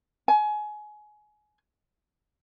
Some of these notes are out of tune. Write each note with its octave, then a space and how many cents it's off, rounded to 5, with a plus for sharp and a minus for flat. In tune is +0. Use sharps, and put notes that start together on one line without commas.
G#5 +25